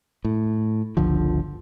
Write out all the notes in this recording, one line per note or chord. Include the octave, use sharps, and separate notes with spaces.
A2
G1 C#2 D3 F3